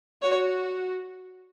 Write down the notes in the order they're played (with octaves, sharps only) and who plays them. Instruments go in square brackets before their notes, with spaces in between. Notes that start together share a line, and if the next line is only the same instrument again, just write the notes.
[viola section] F#4 [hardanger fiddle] C#5